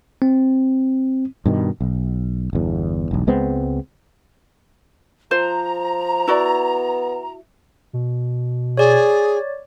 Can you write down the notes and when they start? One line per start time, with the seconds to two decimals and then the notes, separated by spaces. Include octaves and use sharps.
0.22 C4
1.46 G2 B2 D#3
1.81 B1
2.53 G1 E2
3.11 E1 B1
3.27 C#2 G#3 B3 C4
5.31 F3 F4 C5 A#5
6.27 B3 E4 F#4 D5
7.93 B2
8.77 G#4 C#5 D5